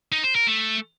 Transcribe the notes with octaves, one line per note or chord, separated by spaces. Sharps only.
D#4
C5
A#4
A3